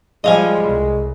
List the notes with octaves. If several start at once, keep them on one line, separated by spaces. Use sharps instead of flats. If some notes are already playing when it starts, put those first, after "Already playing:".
F3 G3 G#3 D#5 F5 G#5
C2